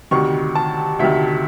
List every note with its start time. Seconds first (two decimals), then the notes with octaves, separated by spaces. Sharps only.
0.11 D2 C3 D#3 C#6
0.55 A5
0.99 D2 C3 D#3 E5